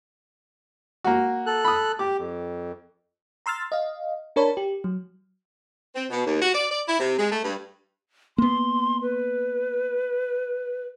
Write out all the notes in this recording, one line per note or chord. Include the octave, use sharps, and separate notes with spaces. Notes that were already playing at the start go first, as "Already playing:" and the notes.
A#3 F#4
A4 F#6
B5 D#6
G4 D6
F2
A#5 C6 E6 F6 A6
D#5 F5
D4 A#4 C#5 A5 B5
G4
F#3
C4
B2
D#2
F#4
D5
D5
E4
C3
G#3
A3
G2
A#3 B3 C6
B4